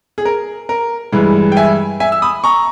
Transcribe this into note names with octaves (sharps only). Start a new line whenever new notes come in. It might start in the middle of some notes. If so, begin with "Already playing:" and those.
G#4
A#4
A#4
G2 E3 G#3
G5
E5 G#5
E5 G#5
E6
B5 D#6
A#5 C#6